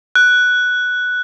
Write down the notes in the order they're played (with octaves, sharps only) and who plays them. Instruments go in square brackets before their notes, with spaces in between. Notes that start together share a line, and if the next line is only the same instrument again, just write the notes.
[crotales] F#6